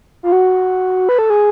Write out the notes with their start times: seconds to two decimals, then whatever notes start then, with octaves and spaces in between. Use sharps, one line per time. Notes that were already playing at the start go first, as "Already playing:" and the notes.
0.23 F4
0.32 F#4
1.09 B4
1.19 A4
1.30 G#4